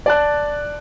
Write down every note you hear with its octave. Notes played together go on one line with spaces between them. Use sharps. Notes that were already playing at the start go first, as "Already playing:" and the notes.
D5 A5 F#6